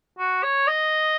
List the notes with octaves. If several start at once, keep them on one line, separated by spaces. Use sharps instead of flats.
F#4
C#5
D#5